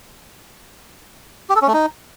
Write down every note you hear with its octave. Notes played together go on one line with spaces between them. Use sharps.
G4
A4
C#4
A3
D#4